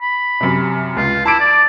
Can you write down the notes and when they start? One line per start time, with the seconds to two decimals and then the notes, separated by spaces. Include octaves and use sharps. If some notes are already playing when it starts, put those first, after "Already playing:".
0.01 B5
0.41 F#2 C3
0.97 C#2 F4
1.25 E4 A5 D6 D7
1.40 D5